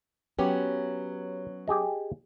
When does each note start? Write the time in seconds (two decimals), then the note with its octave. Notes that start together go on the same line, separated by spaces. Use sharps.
0.39 F#3 B3 C#4 G4
1.68 G4 G#4 D#5